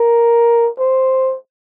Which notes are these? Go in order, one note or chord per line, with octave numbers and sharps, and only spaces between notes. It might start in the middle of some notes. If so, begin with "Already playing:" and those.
Already playing: A#4
C5